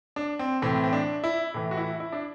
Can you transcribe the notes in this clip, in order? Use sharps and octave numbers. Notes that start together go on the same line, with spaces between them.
D4
C4
A2 E3 C4
C4
D4
E4
A2 E3
F#4
E4
E4
D4